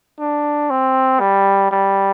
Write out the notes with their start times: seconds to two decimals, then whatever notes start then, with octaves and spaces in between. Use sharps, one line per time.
0.20 D4
0.70 C4
1.21 G3
1.72 G3